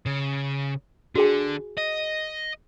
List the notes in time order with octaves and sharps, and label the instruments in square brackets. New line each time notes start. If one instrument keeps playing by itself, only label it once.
[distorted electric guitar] C#3
[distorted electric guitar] D3 [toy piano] F#4 G#4 G#5
[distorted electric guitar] D#5